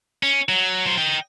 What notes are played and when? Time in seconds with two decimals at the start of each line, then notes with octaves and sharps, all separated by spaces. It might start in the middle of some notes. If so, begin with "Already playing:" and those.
0.23 C#4
0.49 F#3
0.86 F#3 C5
0.98 D#5 G5